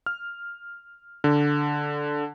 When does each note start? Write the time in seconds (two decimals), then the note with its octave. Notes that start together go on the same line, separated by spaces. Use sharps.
0.06 F6
1.24 D3